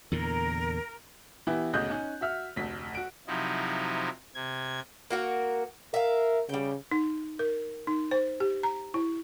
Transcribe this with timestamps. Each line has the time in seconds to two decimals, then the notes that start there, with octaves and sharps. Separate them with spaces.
0.12 E2 A#2 D3 A#4
1.47 E3 B3 E4 G4
1.73 G1 D2 C#3 D#5 F#6 G6
1.90 C#4 D#4
2.21 F#4 E5 F6
2.56 F1 D2 B6
2.95 F#4 D7
3.27 C3 F3 F#3 D#4 E4
4.35 C3 G#6
5.10 A#3 F#4 A#4
5.94 A#4 E5 F5
6.49 C#3 G3 G5
6.91 D#4
7.39 A#4
7.87 D#4
8.11 C5
8.40 G4
8.63 A#5
8.94 E4